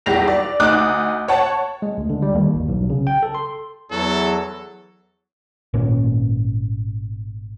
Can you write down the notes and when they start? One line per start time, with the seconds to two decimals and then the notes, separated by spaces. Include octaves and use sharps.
0.06 B1 E2 G3 G4 A#6 F7
0.28 D5
0.60 D2 D#4 D6 D#6 F#6
1.28 C#5 F#5 A5
1.82 G#3
1.97 D2
2.10 D3
2.22 G3
2.35 D#2
2.54 G#1
2.69 B1
2.90 C#3
3.07 G5
3.23 A4
3.35 C6
3.91 E2 F#3 A4
5.74 G#1 A#2 A#3 C#4